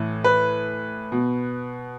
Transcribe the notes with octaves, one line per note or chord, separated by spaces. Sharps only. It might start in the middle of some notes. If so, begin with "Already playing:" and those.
Already playing: A2 E3
B4
B2